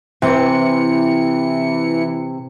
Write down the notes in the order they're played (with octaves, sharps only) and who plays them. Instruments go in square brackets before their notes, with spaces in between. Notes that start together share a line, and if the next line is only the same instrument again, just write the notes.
[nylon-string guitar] C3 [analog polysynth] E3 C#7